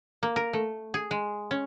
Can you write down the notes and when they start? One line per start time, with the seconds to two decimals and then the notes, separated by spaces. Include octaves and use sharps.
0.23 A#3
0.36 A#4
0.53 A3
0.94 G#4
1.11 G#3
1.51 C#4